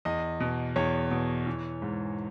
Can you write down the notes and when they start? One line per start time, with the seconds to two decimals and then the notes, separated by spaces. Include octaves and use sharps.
0.05 E2 D#5
0.40 B2
0.76 E2 C#5
1.11 B2
1.46 E3
1.82 G#2